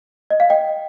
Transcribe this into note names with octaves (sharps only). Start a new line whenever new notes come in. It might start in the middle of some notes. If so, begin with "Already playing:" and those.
D#5
F5
D#5 G5